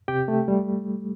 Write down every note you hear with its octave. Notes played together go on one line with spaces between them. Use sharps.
C3 G4 G5
A3
G3